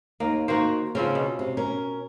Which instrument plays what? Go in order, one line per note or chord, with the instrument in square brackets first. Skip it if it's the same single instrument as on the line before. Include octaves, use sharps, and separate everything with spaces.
[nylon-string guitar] D#2 [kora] A#3
[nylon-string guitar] D#3 F#4 [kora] A#3 C5
[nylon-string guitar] C#3 [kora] F3 C4 C#4
[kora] B2
[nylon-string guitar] C3
C#4 A#4